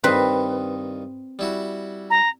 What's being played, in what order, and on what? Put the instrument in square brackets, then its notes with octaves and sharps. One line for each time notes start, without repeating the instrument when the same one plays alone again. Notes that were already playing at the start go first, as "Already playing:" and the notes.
[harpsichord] G2 D#3 [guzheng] C4 B4
[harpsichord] G3 E4 F#4
[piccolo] A#5